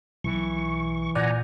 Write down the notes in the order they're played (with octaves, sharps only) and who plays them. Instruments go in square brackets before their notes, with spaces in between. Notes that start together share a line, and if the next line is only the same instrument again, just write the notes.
[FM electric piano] B1 [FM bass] E3 [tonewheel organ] C#6
[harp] A#2 G6 [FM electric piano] D5 [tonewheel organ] F#5 G#5 A#5